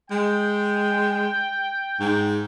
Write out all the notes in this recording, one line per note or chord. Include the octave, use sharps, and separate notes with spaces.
G#3 G5
G#2